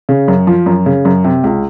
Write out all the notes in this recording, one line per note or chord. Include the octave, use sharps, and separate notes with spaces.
C#3
F#2
F3
F#2
C#3
F#2
C3
C#2